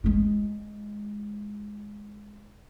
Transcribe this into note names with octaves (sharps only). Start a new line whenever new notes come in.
G#3 F4